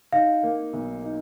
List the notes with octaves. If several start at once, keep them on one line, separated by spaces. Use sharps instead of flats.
D#4 F5
A#3
B1
D#4